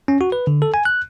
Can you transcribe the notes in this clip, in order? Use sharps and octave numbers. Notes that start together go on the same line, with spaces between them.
C#4
F#4
B4
D3
A4
G#5
F#6